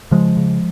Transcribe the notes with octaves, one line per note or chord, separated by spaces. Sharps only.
C#3 F3 G#3
C#3